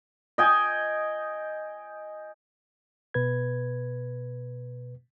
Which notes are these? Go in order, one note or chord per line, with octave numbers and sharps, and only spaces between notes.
D#5 G5 G#5
B2 B4 G#6